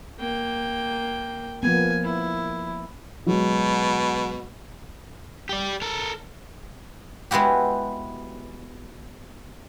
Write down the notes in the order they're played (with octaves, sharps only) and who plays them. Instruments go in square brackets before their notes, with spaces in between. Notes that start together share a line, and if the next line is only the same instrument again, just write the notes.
[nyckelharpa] A#3 G5
[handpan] F3 A#3 B3 [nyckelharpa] G#5
[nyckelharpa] E4
[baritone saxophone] B2 [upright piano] F#3 G#3
[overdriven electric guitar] G4 D5
A4 A#4
[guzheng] G#3 B3 E4 F#4 G4